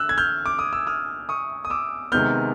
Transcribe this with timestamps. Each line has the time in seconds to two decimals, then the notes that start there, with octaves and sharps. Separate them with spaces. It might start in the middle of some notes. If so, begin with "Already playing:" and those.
Already playing: D3 E6 F#6
0.09 G#6
0.18 F6 G6
0.46 D6
0.59 D#6
0.73 E6
0.87 D#6 F6
1.29 C#6 D#6
1.65 D#6
1.70 D6 E6
2.12 C3 D#3 G#3 B3 F6 G6